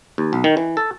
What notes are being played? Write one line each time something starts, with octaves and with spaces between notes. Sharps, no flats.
D#2
B1
D#3
E3
A4